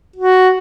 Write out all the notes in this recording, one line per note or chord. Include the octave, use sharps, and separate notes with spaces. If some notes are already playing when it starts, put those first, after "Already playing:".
F#4